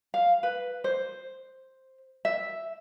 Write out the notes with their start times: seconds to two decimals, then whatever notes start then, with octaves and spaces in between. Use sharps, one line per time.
0.14 F5
0.43 B4
0.84 C5
2.25 E5